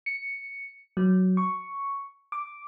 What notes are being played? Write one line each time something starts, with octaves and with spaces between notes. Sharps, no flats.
C#7
F#3
C#6
D6